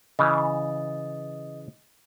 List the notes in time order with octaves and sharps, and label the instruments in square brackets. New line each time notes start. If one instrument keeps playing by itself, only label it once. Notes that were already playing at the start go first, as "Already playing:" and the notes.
[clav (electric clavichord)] C#3 E3 [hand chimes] D#5